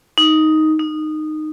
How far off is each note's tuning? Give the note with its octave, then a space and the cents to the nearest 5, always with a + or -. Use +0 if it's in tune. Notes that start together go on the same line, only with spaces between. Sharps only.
D#4 +5
D#4 -15